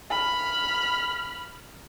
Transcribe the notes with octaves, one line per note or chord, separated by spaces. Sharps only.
B5 F6